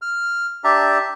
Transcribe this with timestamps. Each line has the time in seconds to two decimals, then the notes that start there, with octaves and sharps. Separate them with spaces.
0.02 F6
0.64 D4 G4 E5 A5 A#5